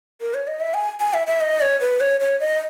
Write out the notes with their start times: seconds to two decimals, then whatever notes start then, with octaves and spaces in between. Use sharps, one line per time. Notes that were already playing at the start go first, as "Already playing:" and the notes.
0.21 A#4
0.34 C#5
0.47 D#5
0.60 E5
0.74 G#5
1.00 G#5
1.14 E5
1.27 E5
1.41 D#5
1.61 C#5
1.81 B4
2.00 C#5
2.20 C#5
2.40 D#5